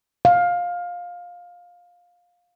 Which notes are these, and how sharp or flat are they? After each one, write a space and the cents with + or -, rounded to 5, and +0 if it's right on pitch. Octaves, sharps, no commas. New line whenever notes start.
F5 +15